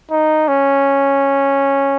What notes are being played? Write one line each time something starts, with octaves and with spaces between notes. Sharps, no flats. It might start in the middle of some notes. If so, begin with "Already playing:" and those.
D#4
C#4